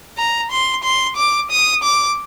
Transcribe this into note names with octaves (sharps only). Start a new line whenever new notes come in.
A#5
C6
C6
D6
D#6
D6